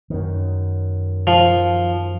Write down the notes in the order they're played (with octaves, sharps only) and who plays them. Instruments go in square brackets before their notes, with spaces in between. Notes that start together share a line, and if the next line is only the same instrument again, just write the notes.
[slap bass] F#2 D#3
[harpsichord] F3